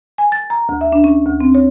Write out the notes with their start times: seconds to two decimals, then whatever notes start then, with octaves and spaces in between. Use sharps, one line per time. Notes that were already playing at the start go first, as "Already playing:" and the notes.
0.18 G#5
0.32 A6
0.50 A#5
0.69 D2
0.81 E5
0.92 D4
1.04 C#4
1.26 D2
1.40 C4
1.55 C#5